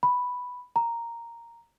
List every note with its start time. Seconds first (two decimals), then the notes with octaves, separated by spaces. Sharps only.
0.03 B5
0.76 A#5